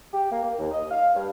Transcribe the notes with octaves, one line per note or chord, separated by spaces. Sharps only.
G4
A#3
A#3
D#2
D#5
F5
G2